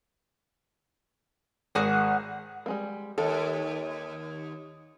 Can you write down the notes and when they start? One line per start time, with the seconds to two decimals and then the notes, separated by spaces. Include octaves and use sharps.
1.75 G#1 F#4 G#4 F#5
2.66 G3 G#3 A#3
3.18 D#2 A4